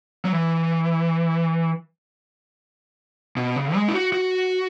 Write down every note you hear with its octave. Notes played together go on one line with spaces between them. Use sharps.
F#3
E3
B2
C#3
G#3
E4
F#4
F#4